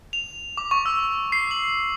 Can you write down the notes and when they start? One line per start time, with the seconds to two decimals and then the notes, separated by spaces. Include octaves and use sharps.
0.13 F7
0.57 D6
0.71 C#6
0.86 E6
1.32 C7
1.51 F#7